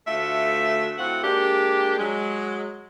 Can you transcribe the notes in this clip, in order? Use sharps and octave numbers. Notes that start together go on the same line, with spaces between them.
D2 A3 F4 A4 E5
A2 C4 F4 F#4 F#5
G#3 A#3 D4 G4
F#3 G#3